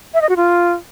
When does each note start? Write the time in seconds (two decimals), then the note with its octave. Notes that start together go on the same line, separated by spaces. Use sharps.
0.14 E5
0.22 D#5
0.29 F#4
0.37 F4